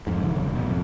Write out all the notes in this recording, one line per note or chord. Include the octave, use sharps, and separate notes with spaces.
F2 G#2
F1 D3 E3
E1 F#2 C#3
G#1 F#2 B2
F2